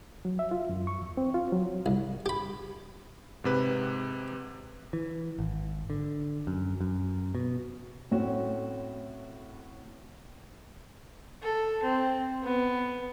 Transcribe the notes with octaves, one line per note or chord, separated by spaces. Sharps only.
F#3
E5
F4
F#2
C#6
E2
C4
F4
F#3
C2
G4 B5
G#2 C3 B4
E3
G#1
D3
F#2
F#2
B2
A2 A3 C4 C#4 F#4
A4
C4
B3